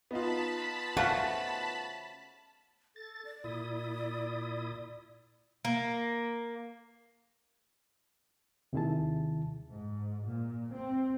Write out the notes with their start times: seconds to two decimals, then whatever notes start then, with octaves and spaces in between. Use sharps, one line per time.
0.11 B3 D#4 F4 A5 B5 B6
0.97 C#3 A3 F#4 C5 F5 F#5
2.96 A4 A6
3.25 D5
3.44 A#2 E4 D#6
5.65 A#3
8.73 D#2 C3 D#3 E4 G#4 A5
9.72 G#2
10.27 A#2
10.74 C4